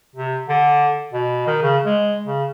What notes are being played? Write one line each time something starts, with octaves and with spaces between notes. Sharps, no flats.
C3
D3
B2
D#3
C#3
G#3
C#3